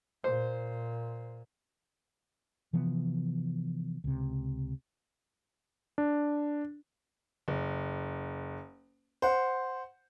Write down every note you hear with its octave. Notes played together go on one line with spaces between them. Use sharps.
A#2 C5
C3 E3 F3 B3
C#2 C3
D4
F#1
C5 F#5